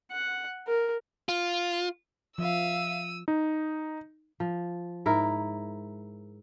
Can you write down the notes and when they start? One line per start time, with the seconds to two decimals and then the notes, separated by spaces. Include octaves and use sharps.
0.11 F#5
0.67 A#4
1.29 F4
2.38 F3 E5 F5 E6 D#7
3.28 D#4
4.40 F3
5.06 G#2 E4 A#4